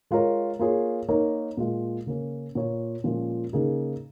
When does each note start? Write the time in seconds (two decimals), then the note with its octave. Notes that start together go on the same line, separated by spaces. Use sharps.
0.11 G#3 F4 A#4 C#5
0.59 A#3 F4 G#4 C#5
1.08 A#3 D#4 A#4 C#5
1.57 A#2 G#3 F4
2.06 C#3 A#3 C#4
2.55 A#2 A#3 F4 A#4 C#5
3.04 A#2 F3 G#3 C#4 F4
3.53 C#3 A#3 D#4 G#4